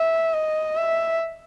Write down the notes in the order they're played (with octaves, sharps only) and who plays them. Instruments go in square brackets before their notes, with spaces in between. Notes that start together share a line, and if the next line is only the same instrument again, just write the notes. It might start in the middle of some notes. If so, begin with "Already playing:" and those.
Already playing: [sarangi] E5
D#5
E5